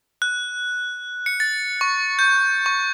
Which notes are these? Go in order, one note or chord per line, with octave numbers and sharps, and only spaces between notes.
F#6
C#7
A6
C#6
G6
C#6